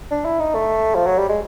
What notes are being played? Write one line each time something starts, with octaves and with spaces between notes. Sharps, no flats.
D4
E4
D#4
A3
F3
F#3
G3
G#3